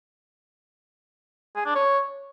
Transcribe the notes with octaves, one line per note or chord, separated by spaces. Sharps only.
G#4
D4
C#5